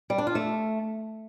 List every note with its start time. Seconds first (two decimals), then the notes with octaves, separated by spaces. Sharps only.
0.10 G3
0.18 D4
0.27 F4
0.35 A3